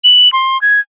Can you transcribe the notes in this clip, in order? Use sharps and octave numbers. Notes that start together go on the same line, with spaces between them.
F#7
C6
G#6